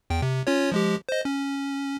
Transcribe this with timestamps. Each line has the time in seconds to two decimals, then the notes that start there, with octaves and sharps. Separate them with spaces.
0.10 E2 G5
0.22 C3
0.47 C#4 F4 C#5
0.72 F3 G#3 G4
1.09 C5 D#5
1.25 C#4